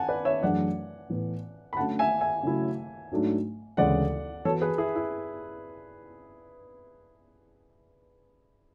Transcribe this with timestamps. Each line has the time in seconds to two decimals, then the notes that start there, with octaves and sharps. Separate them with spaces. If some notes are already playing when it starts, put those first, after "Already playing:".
Already playing: F#5 G#5 A5
0.08 B4 D5
0.25 C#5 E5
0.43 F#2 E3 A3 D4 G#4 D5 F#5
1.09 A2 E3 B3
1.73 B5
1.77 D3 F#3 A3 C#4 F#5 A5
1.99 E5 G#5
2.21 E5 G#5
2.43 C#3 F#3 A3 E4
3.11 G#2 F#3 A3 D4
3.77 D2 C#3 E3 G#3 D5 F#5
4.45 E3 B3 F#4 A4 C#5
4.62 G#4 B4
4.78 E4 G#4
4.96 E4